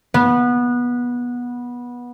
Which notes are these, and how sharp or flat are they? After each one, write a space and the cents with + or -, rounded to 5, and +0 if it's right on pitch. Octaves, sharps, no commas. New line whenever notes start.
B3 -20